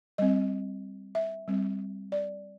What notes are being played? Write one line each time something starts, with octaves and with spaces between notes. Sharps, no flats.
G3 C4 D#5
E5
G3 C4
D5